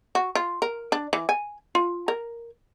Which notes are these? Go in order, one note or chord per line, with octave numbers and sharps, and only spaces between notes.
F#4
F4
A#4
D4
E3
G#5
F4
A#4